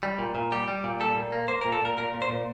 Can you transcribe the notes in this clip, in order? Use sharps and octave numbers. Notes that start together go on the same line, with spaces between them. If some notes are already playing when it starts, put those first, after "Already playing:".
G3
A#2
A#2
G3 G4
G3
A#2
G3 A4
A#2
A#3
A#3 C5
A#2 A#4
A4
A#2 A#4
A#2 A#4
A#2
C5
A#2